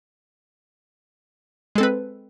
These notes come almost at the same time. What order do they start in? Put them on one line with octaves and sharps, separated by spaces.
G#3 A4 C4 B4